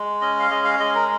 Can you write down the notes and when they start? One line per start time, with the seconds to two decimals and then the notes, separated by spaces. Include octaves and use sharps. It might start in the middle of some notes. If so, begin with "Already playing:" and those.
Already playing: G#3
0.21 C#4 D#5
0.39 F5
0.51 G#3 D#5
0.65 F5
0.79 G#3 D#5
0.95 A#4